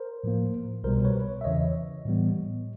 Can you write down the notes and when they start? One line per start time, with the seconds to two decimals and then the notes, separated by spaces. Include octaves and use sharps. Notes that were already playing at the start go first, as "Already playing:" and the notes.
Already playing: A#4 C5
0.24 A2 F3 A#3
0.83 C2 B2 G3 A#4 C5
1.04 B4 C#5
1.41 E5
1.44 E2 C#3 E3 C#5 D#5
2.06 A2 E3 G3 B3